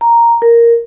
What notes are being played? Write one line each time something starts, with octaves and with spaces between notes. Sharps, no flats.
A#5
A#4